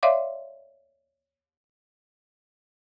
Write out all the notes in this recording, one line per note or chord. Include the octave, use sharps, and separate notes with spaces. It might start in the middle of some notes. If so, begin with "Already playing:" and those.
C#5 D5 E5 F5 C6 D6